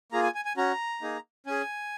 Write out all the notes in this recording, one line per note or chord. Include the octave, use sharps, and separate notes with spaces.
A#3 F4 G#4 A#5
G#5
G#5
G#5
C#4 F#4 A#5
A#3 D#4 G#4
C#4 G#4 G#5